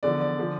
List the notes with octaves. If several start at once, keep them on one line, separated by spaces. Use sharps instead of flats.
E2 D3 F3 D5
D5
D3 F3